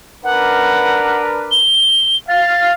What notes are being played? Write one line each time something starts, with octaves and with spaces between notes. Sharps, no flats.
D4 A#4 B4 F#5
G7
F5 A6